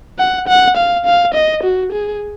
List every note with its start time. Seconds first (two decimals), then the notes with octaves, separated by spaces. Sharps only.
0.19 F#5
0.48 F#5
0.77 F5
1.05 F5
1.34 D#5
1.63 F#4
1.92 G#4